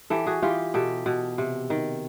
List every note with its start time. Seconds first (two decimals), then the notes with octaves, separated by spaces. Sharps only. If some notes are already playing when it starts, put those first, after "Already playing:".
0.10 E3 G4 A4
0.26 F#4 G#4
0.42 E3 F4 G4
0.74 B2 G4 A4
1.06 B2
1.38 C3
1.70 D#3